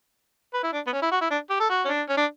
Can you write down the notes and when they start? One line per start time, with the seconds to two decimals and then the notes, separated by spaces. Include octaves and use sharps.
0.54 B4
0.63 E4
0.73 D4
0.87 B3
0.93 C#4
1.02 E4
1.11 F#4
1.21 E4
1.31 D4
1.50 G4
1.60 A4
1.70 F#4
1.85 C#4
1.88 D4
2.09 C#4
2.17 D4